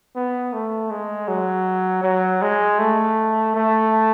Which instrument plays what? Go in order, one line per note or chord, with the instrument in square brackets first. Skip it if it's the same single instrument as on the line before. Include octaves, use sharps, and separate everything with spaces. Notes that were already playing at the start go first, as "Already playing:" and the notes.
[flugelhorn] B3
A3
G#3
F#3
F#3
G#3
A3
A3